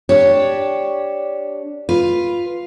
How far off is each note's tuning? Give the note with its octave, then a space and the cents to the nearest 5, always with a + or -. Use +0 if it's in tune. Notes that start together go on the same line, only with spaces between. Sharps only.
D4 -5 G4 +0 C#5 +0
F4 +0 B4 +0